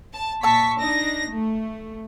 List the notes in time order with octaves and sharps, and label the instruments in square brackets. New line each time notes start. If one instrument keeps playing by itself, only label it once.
[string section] A5
[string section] A#2 C#6 B6 [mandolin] A5 E6
[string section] D4 D#4 A#6
A3